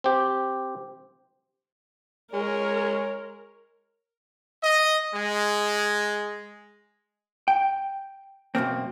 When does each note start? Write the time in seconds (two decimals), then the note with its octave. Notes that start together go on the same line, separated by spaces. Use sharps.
0.04 C4 G4
2.33 G#3 A#4 C#5
4.63 D#5
5.14 G#3
7.48 G5
8.55 F#2 B2 A#3 C4